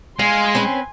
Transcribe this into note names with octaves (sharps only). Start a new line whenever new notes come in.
G#3 F5 G#5 C6
C4 C#4 B4